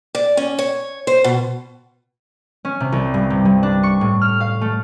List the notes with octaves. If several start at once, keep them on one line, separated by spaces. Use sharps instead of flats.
D5
C#4
C#5
C5
B2
C#4
C3
C2
G2
C3
G2
D4
C#6
A2
F6
F5
A3